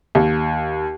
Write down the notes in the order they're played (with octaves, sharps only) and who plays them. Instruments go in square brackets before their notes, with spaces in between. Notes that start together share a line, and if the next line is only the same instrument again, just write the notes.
[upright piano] D#2